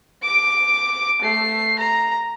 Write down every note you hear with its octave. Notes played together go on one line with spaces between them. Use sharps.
D6 D7
A3 C7
A#5